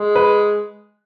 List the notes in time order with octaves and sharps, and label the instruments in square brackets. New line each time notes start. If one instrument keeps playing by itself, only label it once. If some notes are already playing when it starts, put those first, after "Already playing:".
Already playing: [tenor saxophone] G#3
[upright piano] B4